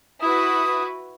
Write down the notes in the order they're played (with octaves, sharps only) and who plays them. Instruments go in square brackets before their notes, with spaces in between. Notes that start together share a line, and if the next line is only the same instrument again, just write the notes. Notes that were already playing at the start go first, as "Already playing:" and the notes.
[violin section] E4 F#4 B4 [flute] D#6